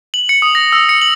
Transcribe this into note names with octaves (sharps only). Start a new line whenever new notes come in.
F#7
C#7
D#6
A#6
E6
C#7
F#7